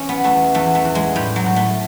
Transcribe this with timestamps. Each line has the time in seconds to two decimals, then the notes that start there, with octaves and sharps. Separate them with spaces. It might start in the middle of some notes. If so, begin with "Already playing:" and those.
Already playing: E3 C#4
0.09 B3
0.24 E2 A3
0.54 E2 A3
0.75 A3
0.85 E2
0.95 G#3
1.16 A2 G3
1.36 F#3
1.46 A2
1.56 A3